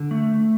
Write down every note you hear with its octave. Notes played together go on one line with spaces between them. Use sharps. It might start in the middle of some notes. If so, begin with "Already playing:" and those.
Already playing: D3
A3